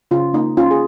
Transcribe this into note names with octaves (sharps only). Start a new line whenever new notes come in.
C#3 F4
A#3 D#4
C#4 F4
G#4